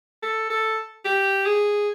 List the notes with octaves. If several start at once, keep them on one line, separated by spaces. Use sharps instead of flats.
A4
A4
G4
G#4